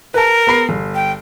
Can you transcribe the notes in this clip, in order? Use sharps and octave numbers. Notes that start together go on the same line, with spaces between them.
A#4 B4 A5
B3 B5 C7
G1
G5